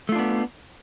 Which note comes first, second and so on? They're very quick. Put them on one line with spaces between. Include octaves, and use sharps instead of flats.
A3 F4 D4 B3